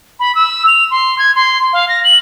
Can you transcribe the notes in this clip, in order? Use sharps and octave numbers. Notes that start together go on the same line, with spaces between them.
B5
E6
F7
C6
G#6
C6
F5
A#6
F#7